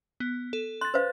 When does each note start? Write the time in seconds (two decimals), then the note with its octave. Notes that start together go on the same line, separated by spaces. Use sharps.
0.20 B3
0.53 A4
0.81 C6 F#6 A6
0.94 B4 C5 F5